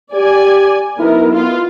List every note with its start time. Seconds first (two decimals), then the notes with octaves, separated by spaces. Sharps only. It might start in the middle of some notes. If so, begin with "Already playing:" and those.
0.13 G4 D5 G#5
0.99 F#2 B3 D#4 E4 A#4
1.32 B3 F4